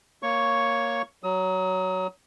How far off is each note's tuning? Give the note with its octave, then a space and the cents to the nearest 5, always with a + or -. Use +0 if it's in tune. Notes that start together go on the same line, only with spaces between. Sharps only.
A#3 +0 C#5 +0 C#6 +0
F#3 +15 D#6 +40